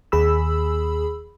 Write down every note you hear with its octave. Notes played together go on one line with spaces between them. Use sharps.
D#2 G#4 B5 E6